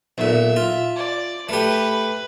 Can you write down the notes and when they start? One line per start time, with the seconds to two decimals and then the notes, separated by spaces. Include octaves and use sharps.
0.18 B1 A#2 E5
0.56 F4
0.96 D5
1.49 A3 G4 B4